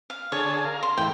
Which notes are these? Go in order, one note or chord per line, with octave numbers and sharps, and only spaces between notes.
F5
D3 G#4 C#5 A5
A#4 F5
C6
E2 A2 G5